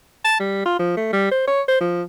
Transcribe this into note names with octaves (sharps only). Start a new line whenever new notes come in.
A5
G3
F4
F3
A3
G3
C5
C#5
C5
F3